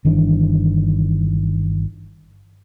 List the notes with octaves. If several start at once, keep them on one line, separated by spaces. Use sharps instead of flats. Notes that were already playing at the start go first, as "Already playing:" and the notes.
G1 D#3 E3 D4